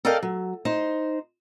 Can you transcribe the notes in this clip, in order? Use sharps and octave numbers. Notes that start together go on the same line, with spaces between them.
A4 A#4 D5 D#5 F5 G5
F#3
D#4 C5